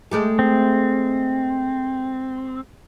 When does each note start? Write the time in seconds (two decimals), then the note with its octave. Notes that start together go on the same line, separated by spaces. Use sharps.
0.11 G#3 A3 G4
0.39 C4